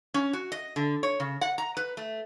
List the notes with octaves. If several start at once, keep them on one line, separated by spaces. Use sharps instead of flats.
C#4
F#4
D#5
D3
C#5
C#3
F#5
A#5
B4
A3